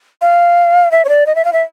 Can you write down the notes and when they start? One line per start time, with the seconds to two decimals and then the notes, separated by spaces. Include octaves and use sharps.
0.22 F5
0.92 E5
1.05 C#5
1.09 D5
1.27 D#5
1.35 E5
1.45 F5
1.53 E5